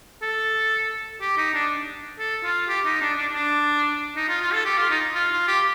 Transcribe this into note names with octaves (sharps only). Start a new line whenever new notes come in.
A4
G4
D#4
D4
A4
F4
G4
D#4
D4
D4
D4
D#4
F4
F4
A4
G4
F4
D#4
F4
F4
G4